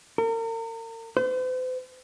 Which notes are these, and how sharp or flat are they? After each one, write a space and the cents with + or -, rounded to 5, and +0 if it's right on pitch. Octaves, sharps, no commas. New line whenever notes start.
A#4 -40
C5 -45